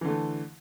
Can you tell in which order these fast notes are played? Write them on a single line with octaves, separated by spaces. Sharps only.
E3 D3 A3